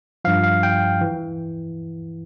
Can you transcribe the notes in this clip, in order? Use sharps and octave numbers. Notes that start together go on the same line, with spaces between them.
G2 F3 F5
F5
G5
E3